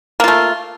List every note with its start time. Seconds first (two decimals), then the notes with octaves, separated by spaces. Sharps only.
0.20 A#3
0.24 F4
0.28 A3